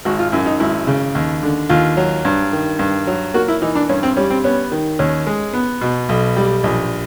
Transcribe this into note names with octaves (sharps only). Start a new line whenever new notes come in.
G#1 F#4
F4
F#2 E4
D#4
G#1 E4
C#3
D#2
D3
D#2 F4
F#3
G2
D#3
G2
F#3
A#3 F#4
E4
E3 D#4
D4
G2 C#4
C4
G3 C#4
C4
B3 C#4
D#3
D#2 C#4
G#3
B3
B2
B1
G3
A#1